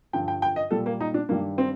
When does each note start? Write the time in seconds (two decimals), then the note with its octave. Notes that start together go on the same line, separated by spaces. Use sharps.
0.13 G2 D3 F3 G5
0.28 G5
0.42 G5
0.56 D#5
0.71 A#2 G3 A4
0.86 A#3
1.00 D#4
1.14 D4
1.29 G2 D#3 G3 A#3
1.58 C4